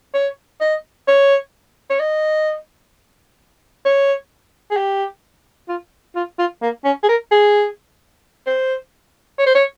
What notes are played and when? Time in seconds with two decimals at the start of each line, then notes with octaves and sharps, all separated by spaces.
0.14 C#5
0.61 D#5
1.08 C#5
1.90 C#5
2.00 D#5
3.85 C#5
4.71 G#4
4.77 G4
5.69 F4
6.16 F4
6.39 F4
6.62 A#3
6.85 C#4
7.04 G#4
7.09 A#4
7.32 G#4
8.47 C5
9.39 C#5
9.46 C5
9.55 C#5